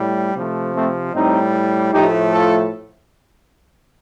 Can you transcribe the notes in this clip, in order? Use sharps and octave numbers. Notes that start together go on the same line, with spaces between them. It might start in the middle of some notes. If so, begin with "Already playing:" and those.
Already playing: A2 G3
C3 F3 A3
A3 C4
A2 G3 C4 D#4
A2 F3 A3 D#4 G4
F4 A4